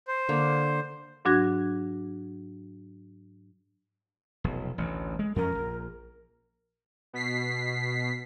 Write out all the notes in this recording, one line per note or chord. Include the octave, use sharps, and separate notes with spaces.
C5
D3 A#3
G#2 F#3 D4 F#4 G#6 A#6
F1 B1
A1 D2
G#3
F2 F3 C#4 A#4
A#1
B2 B6 C7